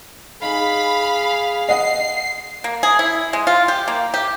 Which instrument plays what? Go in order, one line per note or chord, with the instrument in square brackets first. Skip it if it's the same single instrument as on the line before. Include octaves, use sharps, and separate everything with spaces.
[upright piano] D#4 [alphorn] G#4 [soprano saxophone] F5 [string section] B5
[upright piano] D#5 F#5 [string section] C7
[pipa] A#3
G#4
E4
G#3
F4
G4
A#3
G4